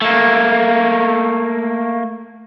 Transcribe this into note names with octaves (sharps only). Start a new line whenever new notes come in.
A3 A#3